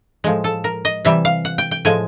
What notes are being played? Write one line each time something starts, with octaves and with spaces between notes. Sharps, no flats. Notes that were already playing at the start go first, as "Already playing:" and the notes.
A2 F3 G#3
A4
A#4
D#5
C3 E3 G3 E5
F5
F#5
G5
G5
A2 F3 G#3 G#5